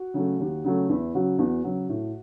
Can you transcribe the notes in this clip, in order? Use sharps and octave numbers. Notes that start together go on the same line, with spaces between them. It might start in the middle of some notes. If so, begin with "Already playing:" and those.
Already playing: F#4
C#3 F#3 A3
D#2
C#3 F#3 A3
E2 E4
C#3 F#3 F#4
E2 F#4
C#3 F#3
A2